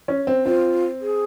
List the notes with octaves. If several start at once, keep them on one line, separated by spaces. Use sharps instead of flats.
C#4
C4
C4 F4
G#4